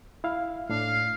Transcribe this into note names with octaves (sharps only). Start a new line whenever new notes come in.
E4 F5
A2 D4 F5